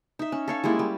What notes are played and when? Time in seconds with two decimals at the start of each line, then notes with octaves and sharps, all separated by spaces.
0.19 D#4 E5
0.32 C#4
0.48 A4 C#5 F5
0.64 G3 G#3 A#3 E4
0.79 G3